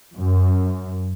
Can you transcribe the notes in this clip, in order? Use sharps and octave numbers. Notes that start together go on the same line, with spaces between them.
F#2